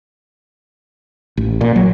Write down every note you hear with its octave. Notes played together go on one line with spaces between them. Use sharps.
A1
A#2
F#3